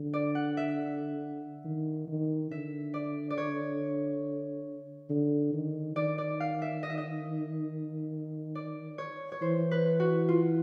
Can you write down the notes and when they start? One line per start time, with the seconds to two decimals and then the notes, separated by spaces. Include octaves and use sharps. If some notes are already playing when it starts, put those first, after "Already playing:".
Already playing: D3
0.13 D5
0.35 F#5
0.57 E5
1.65 D#3
2.08 D#3
2.51 D3 E5
2.94 D5
3.30 D5
3.38 C#5
5.10 D3
5.54 D#3
5.96 D#3 D5
6.18 D5
6.40 F5
6.62 E5
6.83 D#5
6.90 E5
6.98 D#5
8.55 D5
8.98 C#5
9.32 C#5
9.42 E3 C5
9.71 B4
10.00 F#4
10.29 F4